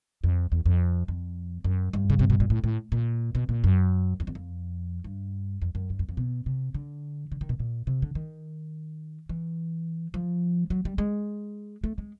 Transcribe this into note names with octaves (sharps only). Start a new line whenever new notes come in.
F2
E2
F2
F2
F#2
G2
C#3
C3
B2
A#2
A2
A2
A#2
B2
A#2
F#2
F2
E2
F2
G2
F2
F#2
G2
F#2
F2
B2
C3
D3
D3
D#3
B2
A#2
C3
D3
D#3
E3
F3
F#3
G3
G#3
A3
G#3